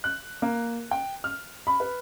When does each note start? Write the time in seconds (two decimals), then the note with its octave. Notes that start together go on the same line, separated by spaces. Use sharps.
0.04 F#6
0.42 A#3
0.91 G5
1.24 F6
1.67 B5
1.80 B4